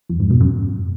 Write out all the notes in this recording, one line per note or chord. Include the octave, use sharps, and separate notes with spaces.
F2
G#2
B2
F#2